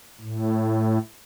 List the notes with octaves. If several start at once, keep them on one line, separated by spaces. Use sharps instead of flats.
A2